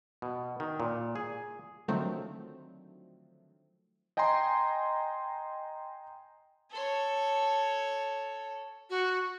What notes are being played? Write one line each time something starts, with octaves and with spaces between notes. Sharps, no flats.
B2
D#3
A#2
G#4
D3 D#3 F3 F#3 A3 C4
D#5 G5 G#5 A#5 C6
A4 C#5
F#4